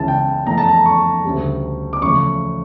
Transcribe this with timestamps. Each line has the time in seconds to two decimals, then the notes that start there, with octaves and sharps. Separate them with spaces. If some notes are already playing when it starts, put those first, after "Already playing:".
Already playing: C#2 C#3 E3 A5
0.08 G5
0.47 F2 E3 A3 A#5
0.58 A5
0.69 A#5
0.86 C#6
1.24 D2 C#3 G3
1.93 D6
2.02 E2 C#3 F3 A3 C#6